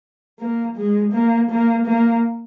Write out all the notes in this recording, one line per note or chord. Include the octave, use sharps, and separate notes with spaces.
A#3
G#3
A#3
A#3
A#3